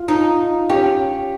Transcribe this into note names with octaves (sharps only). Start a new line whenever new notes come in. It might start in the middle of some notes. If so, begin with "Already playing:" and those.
Already playing: F4
D#4
C#4 G4